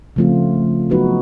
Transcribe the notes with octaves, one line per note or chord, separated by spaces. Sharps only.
C#3 F3 A3 C4 F4
F#3 B3 D#4 F#4 B4